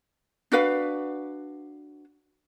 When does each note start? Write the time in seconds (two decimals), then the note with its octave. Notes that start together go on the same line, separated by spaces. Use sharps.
0.52 D4 F#4 B4 F5